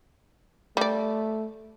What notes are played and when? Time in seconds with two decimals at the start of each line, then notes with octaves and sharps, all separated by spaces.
0.77 G3 A3 D5